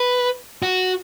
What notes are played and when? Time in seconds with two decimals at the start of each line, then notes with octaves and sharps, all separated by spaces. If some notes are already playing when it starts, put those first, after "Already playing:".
Already playing: B4
0.62 F#4